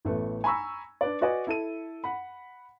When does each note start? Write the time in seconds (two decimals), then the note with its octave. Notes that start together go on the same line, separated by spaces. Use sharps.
0.05 A1 A3 B3
0.44 G#5 A#5 B5 C#6 E6
1.01 D4 B4 D5
1.21 F#4 B4 D5 D#5 G#5
1.47 E4 A4 D#7
2.04 F#5 B5